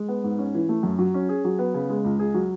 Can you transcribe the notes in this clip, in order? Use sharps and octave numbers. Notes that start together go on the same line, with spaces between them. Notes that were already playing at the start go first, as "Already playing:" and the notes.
Already playing: G#3
B3
G#2
C#4
E3
A3
F#2
F#3
C#4
G#4
F#3
B3
C#3
G#3
C#2
G#4
F#3